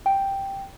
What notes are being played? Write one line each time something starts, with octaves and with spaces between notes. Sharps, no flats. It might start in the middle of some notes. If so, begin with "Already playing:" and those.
G5